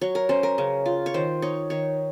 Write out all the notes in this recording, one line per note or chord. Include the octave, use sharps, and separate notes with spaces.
F#3 C#5
A#4
C#4 C5
A#4
C#3
F4
C#5
D#3 C5
D#4 C#5
D#3 C#5